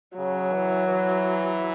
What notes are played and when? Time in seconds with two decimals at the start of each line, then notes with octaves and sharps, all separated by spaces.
0.17 C#3 F#3
0.53 E3
0.88 E3